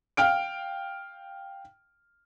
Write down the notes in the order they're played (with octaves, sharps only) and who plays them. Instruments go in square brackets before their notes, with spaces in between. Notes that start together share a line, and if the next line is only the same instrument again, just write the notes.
[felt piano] F5 G5 F6 D7